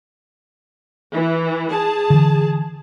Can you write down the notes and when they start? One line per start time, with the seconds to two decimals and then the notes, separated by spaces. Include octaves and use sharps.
1.11 E3
1.71 G#4 A5
2.10 D3 E3